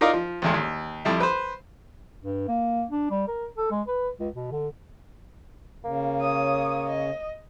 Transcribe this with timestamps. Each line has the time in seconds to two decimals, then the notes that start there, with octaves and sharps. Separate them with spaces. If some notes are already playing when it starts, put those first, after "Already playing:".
0.01 D#4 F4 A#4 D5 D#5 F5
0.13 F3
0.42 A1 E2 G#3
0.54 D#2
1.05 F2 G3 E4
1.20 B4 C5
2.22 G2
2.48 A#3
2.90 D4
3.11 G3
3.28 A#4
3.57 A4
3.71 G#3
3.88 B4
4.20 C#2
4.34 B2
4.52 D3
5.84 C#3 A#3
6.21 C#5 D#6
6.87 D#5